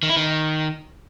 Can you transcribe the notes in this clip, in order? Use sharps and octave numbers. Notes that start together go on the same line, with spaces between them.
D#3
E4
D#3